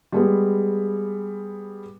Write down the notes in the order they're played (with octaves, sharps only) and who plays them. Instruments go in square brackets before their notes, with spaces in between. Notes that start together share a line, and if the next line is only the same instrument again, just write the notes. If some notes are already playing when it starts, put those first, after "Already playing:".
[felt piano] G3 G#3 B3